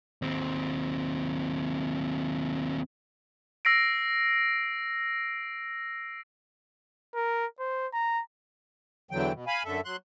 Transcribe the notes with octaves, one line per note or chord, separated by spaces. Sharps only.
D#2 C4
E6 A#6 C7 D7
A#4
C5
A#5
E2 D3 E3 F#3 G5
B2
F5 G#5 B5
F#2 D3 A4 E5
F#3 C6 F#6